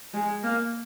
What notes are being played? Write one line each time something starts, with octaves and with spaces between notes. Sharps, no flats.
G#3
A#3